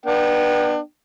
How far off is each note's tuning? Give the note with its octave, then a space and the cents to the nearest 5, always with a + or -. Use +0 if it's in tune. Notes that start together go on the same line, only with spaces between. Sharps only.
B3 -25 D4 +30 G5 -20